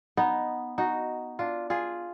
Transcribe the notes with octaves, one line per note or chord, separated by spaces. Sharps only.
B3 D#4
D#4 F#4
D4 F4
F4 G#4